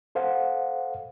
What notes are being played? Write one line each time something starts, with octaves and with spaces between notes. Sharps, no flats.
A4 C5 F5 F#5